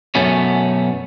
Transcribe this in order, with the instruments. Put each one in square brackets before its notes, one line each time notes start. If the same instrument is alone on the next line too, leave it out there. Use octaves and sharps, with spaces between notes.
[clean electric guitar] F#2 B2 A3 B3 C#4